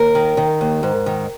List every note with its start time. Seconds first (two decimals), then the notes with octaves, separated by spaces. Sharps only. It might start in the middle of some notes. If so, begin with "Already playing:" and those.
Already playing: D#2 A#4
0.15 D#3
0.37 D#3
0.61 D#2
0.83 G#2
1.06 D#3